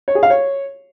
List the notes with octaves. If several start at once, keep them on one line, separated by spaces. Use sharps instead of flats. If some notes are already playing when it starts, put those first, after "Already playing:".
C#5
G#4
F5
C#5